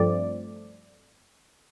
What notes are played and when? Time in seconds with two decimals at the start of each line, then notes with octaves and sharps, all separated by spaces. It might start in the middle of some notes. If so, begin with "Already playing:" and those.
Already playing: G2 F3 A3 C4 D5